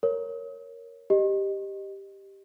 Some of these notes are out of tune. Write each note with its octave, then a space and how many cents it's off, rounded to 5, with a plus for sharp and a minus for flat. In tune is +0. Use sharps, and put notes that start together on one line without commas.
A#4 +0 C#5 +0
G4 +0 D#5 -15